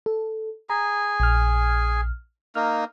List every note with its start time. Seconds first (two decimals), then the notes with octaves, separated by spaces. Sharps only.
0.06 A4
0.70 G#4 G#5 A#5
1.20 A#1 F6
2.55 A#3 D#4 F6